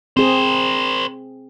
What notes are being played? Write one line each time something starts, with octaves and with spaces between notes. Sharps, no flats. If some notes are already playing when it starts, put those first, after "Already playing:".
C4 G#4 A#4 C5